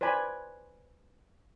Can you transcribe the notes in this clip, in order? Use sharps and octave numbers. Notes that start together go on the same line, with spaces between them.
B4 C5 D5 G#5 B5